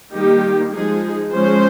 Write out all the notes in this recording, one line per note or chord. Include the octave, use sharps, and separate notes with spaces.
D#3 G3 A#3 D#4 G4
F3 G#3 D#4 G#4
F3 G#3 C#4 C5